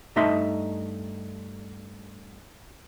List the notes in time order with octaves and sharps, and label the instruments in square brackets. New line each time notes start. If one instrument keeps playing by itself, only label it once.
[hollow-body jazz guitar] G2 A3 D#4 D#5 E5 C6